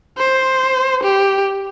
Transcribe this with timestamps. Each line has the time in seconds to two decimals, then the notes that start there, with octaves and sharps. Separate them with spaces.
0.18 C5
1.03 G4